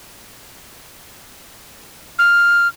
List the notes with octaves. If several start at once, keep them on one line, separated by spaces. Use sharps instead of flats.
F6